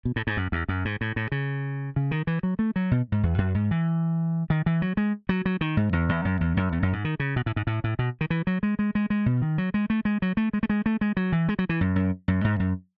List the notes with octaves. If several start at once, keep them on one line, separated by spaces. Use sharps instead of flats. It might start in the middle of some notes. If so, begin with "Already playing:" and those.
B2
A2
G#2
F#2
E2
F#2
G#2
A2
A2
C#3
C#3
D#3
E3
F#3
A3
F#3
B2
G#2
E2
F#2
G#2
E3
D#3
E3
F#3
G#3
F#3
F#3
D#3
G#2
E2
E2
F#2
E2
F#2
E2
F#2
G#2
D#3
C#3
B2
A2
G#2
A2
A2
B2
D#3
E3
F#3
G#3
G#3
G#3
G#3
B2
D#3
F#3
G#3
A3
G#3
F#3
A3
G#3
A3
G#3
A3
G#3
F#3
E3
G#3
F#3
E3
F#2
F#2
F#2
G#2
F#2